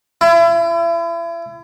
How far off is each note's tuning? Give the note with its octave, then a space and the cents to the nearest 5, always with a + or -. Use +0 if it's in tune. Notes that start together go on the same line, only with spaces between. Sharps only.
E4 +35